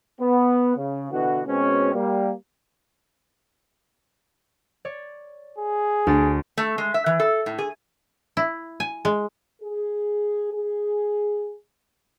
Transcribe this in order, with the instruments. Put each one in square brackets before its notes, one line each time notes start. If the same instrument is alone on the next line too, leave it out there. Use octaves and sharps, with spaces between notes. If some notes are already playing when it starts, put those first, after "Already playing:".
[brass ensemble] B3
C#3
B2 D3 E3 F#4
B2 G#3 C4 C#4
G3 A#3
[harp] C#5 D5
[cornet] G#4
[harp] D2 A6 D7
[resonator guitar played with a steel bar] A3
G#3
E5
E3
A4
A2
G#4
[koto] E4
G#5
G#3
[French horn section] G#4
G#4